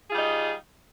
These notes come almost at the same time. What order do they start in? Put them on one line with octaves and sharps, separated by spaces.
G#4 F4 G3 D#4